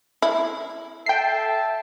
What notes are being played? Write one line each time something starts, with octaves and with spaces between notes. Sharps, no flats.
E4
A4 E5 G5 A5 C7